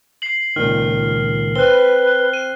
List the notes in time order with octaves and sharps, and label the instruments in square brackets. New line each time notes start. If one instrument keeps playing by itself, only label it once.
[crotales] C7 F#7
[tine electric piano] C#2 A#2 D#3 [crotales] F6
[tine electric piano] C4 [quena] B4 [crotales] F#6 G7
[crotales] D#7